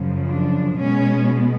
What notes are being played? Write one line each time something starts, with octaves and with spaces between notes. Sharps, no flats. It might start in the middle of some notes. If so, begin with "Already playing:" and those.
Already playing: F#2 C#3 F3
D4
B2 G#3 B3 C#4